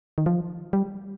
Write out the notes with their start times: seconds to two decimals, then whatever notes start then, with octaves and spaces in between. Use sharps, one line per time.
0.18 D#3
0.26 F3
0.73 G3